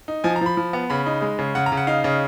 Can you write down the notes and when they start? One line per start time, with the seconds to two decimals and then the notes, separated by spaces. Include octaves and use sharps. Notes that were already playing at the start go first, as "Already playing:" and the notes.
0.08 D#4
0.24 F3 G#5
0.36 A#5
0.41 F3 B5
0.57 F3
0.73 B3
0.90 C#3 B5
1.06 D#4
1.22 G#3
1.39 C#3
1.55 C#3 F#5
1.66 A#5
1.72 C#3
1.77 F#5
1.87 D#4 F5
2.04 C#3